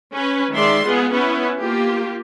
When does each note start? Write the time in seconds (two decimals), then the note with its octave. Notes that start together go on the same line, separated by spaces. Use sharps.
0.13 C#4 B4
0.52 D#3 G#3 D5 E5 C6
0.84 G#3 B3 F4 G#4
1.13 B3 C#4 E4 B4
1.60 A#3 F4 G4